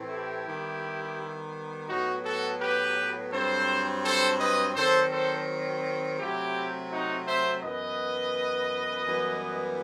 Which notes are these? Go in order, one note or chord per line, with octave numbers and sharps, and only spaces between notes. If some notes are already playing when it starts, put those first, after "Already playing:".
Already playing: A2 E3 A3 C4
E4 G4
D#3 G3 B3
A2 F#3 B3 D#4 F#4
F#4 A4
G4 B4
G2 F#3 C4 A4 C5
A4 C5
B4 D#5
D#3 F#3 C4 A4 C5
A4 C5
C3 F#3 A3 C4 E4 G4
D#4 F#4
C5 E5
F#2 E3 B3 B4 D#5
F#2 E3 G3 B3